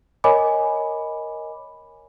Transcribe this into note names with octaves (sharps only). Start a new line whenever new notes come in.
A#4 C#5 D#5 G#5 B5 D6